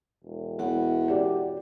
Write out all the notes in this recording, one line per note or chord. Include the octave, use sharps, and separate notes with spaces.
E1
E2 F#4 C#5 F#5
G4 D5